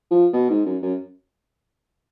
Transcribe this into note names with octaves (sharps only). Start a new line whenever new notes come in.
F3
B2
G#2
F#2
F#2